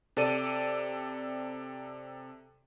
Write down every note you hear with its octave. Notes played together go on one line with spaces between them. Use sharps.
C3 A4 D5 D#7